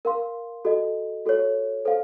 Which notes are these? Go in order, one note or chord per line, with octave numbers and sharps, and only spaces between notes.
A#4 F5 C6
F#4 A4 D#5
F#4 A4 C#5
A4 C5 F5